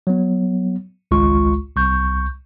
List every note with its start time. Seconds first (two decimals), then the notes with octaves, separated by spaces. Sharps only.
0.07 F#3 B3
1.11 G#1 C#2 G#3 F4 C#6
1.76 C2 C#6 G6